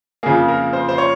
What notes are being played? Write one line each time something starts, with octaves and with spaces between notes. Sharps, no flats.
F2 C#3 F3 A#3 G#4
A#4
C5
C5
C#5